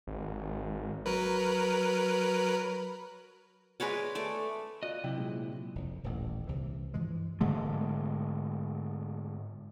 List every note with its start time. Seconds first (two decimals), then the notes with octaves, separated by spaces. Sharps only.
0.07 G#1
1.06 F#3 A#4 B4
3.80 G#3 B4 C#5 D5
4.15 A3 D5
4.83 F4 D5 D#5 F#6
5.04 C3 F#3 E4 G5
5.17 A#2 G#3 C4
5.75 F1
6.04 D#1 A1
6.47 C2 E3
6.94 G2 E3 F3 G#3
7.41 G#2 D3 G#3 A3